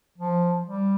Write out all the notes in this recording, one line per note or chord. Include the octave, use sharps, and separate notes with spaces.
F3
G3